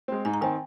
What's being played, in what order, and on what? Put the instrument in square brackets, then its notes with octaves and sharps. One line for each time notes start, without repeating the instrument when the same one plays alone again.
[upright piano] G#3 C4
[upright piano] G#2 [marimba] G#5
[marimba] A#5
[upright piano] D#3 C4 [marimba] G#5